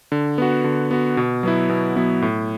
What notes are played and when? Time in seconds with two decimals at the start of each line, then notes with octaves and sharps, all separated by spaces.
0.12 D3
0.38 B3 F#4
0.64 D3
0.91 B3 F#4
1.17 B2
1.43 F#3 B3 E4
1.70 B2
1.96 F#3 B3 E4
2.22 A2